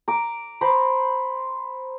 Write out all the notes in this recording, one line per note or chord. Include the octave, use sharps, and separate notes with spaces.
A#5 D6
C5 A#5 B5 D6